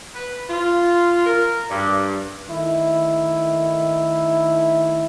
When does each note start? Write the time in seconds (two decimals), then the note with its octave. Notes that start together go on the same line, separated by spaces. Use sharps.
0.15 B4
0.49 F4
1.26 A#4
1.70 G2
2.48 D#3 A3 E4